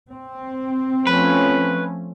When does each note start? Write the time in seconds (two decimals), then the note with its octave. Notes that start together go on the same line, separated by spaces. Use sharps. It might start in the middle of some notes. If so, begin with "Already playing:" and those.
0.12 C4
1.07 F3 A3 C#4 B4